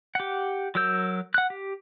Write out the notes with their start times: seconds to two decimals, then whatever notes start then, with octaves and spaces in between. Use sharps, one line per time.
0.15 G4 F#5
0.75 F#3 F#4 A#4 E6 G6
1.34 F#5 F#6
1.50 G4